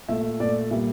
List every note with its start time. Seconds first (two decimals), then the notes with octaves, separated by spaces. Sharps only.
0.09 A#2 A3 E5
0.40 A#2 A3 D5
0.71 A#2 G3 A#3 E5